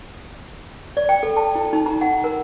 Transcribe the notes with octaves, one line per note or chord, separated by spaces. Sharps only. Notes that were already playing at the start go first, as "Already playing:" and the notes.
D5
G5
A4
A5
E4
D#4
A#5
F#5
A#4